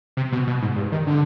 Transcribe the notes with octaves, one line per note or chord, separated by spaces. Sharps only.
C3
B2
B2
G#2
G2
D#3
D3